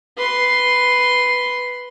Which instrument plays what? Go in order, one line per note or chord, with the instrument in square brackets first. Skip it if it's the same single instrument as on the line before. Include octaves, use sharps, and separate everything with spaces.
[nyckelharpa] B4 C6